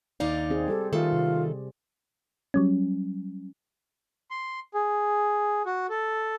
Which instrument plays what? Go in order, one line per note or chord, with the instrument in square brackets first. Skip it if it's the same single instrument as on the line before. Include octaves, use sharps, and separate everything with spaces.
[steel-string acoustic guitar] D#2 D#4 F5 [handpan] D5
[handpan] C4 G#4
[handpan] G3 G4 [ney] A4
[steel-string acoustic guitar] D#3 A3 A4 [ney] F4
[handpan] C3
[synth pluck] F#3 G3 C#4
[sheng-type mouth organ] C6
G#4
F#4
A4